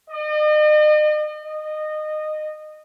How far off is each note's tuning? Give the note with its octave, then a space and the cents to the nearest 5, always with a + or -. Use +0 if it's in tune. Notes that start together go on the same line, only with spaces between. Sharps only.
D#5 -40
D#5 -20